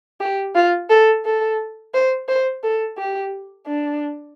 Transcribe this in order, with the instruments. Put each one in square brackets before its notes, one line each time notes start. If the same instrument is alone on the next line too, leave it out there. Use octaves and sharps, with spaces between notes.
[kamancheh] G4
F4
A4
A4
C5
C5
A4
G4
D4